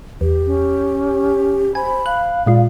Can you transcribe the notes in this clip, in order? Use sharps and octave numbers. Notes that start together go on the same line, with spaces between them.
E2 G4
C#4
C5 G#5 B5
F5 F#6
A#2 G#3 F4 D5 F5